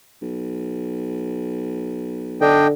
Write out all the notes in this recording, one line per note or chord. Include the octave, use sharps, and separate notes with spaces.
B1
D3 D4 D#5 G5